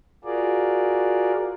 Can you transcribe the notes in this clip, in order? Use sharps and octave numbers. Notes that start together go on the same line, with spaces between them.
F4 F#4 G#4 A#4 D5